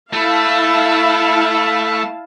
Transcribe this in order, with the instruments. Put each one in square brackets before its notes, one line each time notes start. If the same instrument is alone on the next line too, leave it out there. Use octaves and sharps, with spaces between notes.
[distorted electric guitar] A3 [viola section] E4 F5 A5